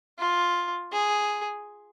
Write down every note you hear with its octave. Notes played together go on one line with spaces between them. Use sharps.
F4
G#4